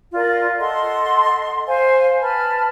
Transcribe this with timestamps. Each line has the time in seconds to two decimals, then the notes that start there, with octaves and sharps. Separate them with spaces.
0.13 F4 A#4 D5
0.59 A4 D#5 F#5 C6
1.67 C5 F5 G#5
2.21 B4 A5 B5 F6